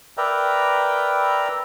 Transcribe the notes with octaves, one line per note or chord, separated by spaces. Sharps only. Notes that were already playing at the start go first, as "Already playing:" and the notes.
A#4 B4 D5 E5 G5 A#5